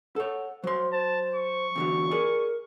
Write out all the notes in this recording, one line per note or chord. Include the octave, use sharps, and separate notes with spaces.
A4 C#5 F#5
F#3 C5 C6
C5 A5
C#6
E2 D3 F#3
G#4 A#4 D5